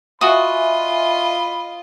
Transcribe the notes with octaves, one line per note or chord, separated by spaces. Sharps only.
F4 F#4 D#5 E5 G#5 B5 D#6